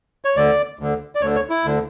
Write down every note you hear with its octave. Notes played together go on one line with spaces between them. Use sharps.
C#5
D2 D3 D5
D2 D3
D5
D2 D3 C#5
C#5
E4
D2 D3